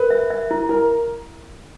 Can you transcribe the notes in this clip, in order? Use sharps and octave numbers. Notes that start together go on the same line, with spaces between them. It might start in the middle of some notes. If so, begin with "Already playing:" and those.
Already playing: A#4 B4
E5
E5
E4
E4 A#4